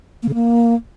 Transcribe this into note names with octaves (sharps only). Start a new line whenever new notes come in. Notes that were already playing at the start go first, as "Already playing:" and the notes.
A#3
C#3
A#3